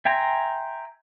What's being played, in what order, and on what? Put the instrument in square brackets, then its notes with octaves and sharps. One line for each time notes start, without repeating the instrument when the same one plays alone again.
[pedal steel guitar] E5 G5 G#5 A#5 C6